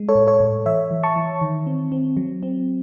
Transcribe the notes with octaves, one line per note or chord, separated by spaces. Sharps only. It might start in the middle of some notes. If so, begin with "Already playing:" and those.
Already playing: G#3
A4 C#5
A2
A4 C#5
A2
E3 C#5 E5
E3
A5 C#6
E3
D#3
C4
C4
F#3
C4